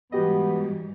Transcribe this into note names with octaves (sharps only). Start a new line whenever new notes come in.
G#2 E3 G3 B3 F#4 G4 D#5